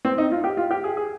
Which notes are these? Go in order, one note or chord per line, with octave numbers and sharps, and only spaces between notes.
C4
D#4
F4
G4
F4
G4
G#4
G#4